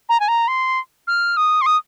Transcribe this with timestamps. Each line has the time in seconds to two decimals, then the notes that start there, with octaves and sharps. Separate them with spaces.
0.09 A#5
0.20 G#5
0.28 A#5
0.48 C6
1.07 F6
1.37 D#6
1.62 C6
1.66 D#6